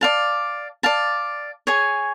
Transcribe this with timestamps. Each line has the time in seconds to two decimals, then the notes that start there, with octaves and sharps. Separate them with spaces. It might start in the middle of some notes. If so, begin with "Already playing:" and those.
0.01 D5 F5 A5
0.83 D5 F5 A5
1.67 G#4 C#5 G#5